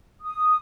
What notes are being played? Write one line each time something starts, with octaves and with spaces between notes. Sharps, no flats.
D#6